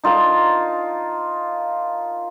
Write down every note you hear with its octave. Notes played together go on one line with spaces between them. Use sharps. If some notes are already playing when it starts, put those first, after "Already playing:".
D#4 F4 A#4 A5